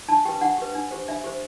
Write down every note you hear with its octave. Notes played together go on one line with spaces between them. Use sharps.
D4 A5
G4 B4 G5
D4 F#5
G4 B4
D4
G4 C5
D4 E5
G4 C5